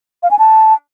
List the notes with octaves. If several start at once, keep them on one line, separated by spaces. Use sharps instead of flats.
F5
G#5
A5